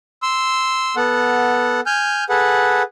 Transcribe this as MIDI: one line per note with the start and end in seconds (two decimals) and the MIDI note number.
0.22 0.95 84
0.22 0.95 88
0.96 1.80 59
0.96 1.80 69
0.96 1.80 78
1.86 2.24 80
1.86 2.24 89
1.86 2.24 91
2.29 2.83 68
2.29 2.83 69
2.29 2.83 71
2.29 2.83 78